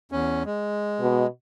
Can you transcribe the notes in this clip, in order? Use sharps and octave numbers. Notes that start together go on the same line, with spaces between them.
E2 C#4
G#3
B2